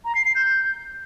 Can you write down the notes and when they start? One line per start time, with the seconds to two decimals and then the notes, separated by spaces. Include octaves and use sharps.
0.05 A#5
0.15 C7
0.25 C7
0.35 G6